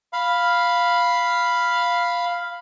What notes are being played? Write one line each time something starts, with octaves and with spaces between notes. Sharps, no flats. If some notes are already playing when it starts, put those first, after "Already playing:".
F5 B5